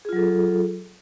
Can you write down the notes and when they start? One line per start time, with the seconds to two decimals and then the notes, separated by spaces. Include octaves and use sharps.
0.05 G#4
0.09 F4
0.13 F#3
0.16 A4